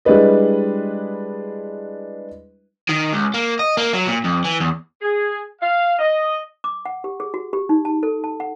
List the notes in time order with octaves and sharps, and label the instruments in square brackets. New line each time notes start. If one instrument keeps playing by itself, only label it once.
[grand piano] G3 G#3 D4 E4 B4 D#5
[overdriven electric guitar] D#3
C#2
A#3
D#5
A#3
F#3
A#2
F2
E3
E2
[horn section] G#4
F5
D#5
[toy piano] D6
F#5
G4
G#4
F#4
G4
D#4
A5
A4
A5
F#5